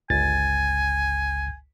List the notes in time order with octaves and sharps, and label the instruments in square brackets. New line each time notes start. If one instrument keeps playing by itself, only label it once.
[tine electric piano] G1 C#2 A6 [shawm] G#5